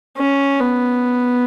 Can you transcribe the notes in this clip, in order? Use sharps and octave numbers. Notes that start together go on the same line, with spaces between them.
C#4
B3